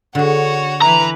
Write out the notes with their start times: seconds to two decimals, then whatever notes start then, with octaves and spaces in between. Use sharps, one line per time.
0.15 D3 F#4 G#4 C#5
0.82 E3 E4 B4 A#5